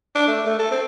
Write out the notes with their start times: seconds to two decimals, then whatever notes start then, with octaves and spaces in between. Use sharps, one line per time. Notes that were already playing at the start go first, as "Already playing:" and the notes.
0.16 D4
0.28 A3
0.46 A3
0.59 A4
0.71 C4